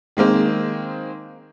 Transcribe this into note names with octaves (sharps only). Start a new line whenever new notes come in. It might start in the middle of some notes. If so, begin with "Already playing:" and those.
D#3 G#3 A#3 C4